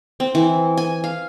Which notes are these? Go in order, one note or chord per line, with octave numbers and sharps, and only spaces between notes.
C4
E3
G#5
F5